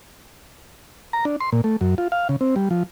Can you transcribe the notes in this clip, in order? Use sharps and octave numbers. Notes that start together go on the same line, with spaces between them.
A#5
D4
C6
A#2
A3
F#2
F4
F5
C#3
C4
G3
F3